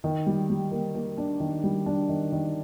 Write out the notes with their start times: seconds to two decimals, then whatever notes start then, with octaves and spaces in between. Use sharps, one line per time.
0.04 D#3
0.26 G3
0.50 G3
0.71 A#3
0.95 A#3
1.18 D4
1.40 D#3
1.63 G3
1.86 D4
2.09 D#3
2.32 D#3